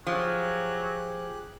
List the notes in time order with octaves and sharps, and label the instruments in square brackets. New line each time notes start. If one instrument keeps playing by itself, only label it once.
[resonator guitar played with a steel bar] F3 [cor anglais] F#3 [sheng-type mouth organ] G4 G#4 F#6